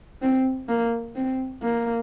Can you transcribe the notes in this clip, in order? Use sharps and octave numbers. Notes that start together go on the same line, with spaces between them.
C4
A#3
C4
A#3